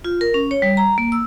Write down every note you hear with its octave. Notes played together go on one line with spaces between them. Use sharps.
F4
A#4
C#4
C#5
G3
A#5
A#3
E6